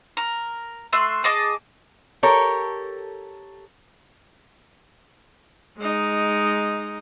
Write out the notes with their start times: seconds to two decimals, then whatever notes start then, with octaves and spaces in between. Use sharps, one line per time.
0.17 A#4
0.93 A3 E5 C6 F#6
1.24 G#4 D#5 A5 D6
2.23 G4 A4 A#4 C#5
5.78 G#3 D#4